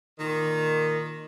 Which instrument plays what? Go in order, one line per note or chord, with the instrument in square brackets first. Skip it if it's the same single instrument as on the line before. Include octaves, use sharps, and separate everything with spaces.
[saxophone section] A#2 D#3